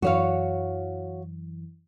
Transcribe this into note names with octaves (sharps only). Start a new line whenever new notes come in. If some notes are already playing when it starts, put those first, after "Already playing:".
F#2 E3 F#4 C#5 F5